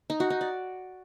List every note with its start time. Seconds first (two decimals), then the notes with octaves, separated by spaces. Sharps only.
0.10 D#4
0.20 F#4
0.30 D#4
0.41 D5